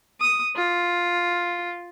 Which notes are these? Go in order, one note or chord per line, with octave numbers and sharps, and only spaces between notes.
D#6
F4